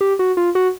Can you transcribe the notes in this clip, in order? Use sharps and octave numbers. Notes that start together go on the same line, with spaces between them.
G4
F#4
F4
F#4